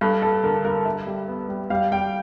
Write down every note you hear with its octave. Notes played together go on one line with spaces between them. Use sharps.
G2 A4
G2 A4
D3 A#4
G2 A#4
G2 E5
G3
B3
G3
G3 F5
G3 G5